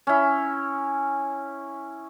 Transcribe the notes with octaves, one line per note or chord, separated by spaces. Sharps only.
C#4 E4